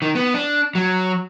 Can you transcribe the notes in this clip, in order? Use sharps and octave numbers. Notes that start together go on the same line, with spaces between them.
D#3
B3
D4
F#3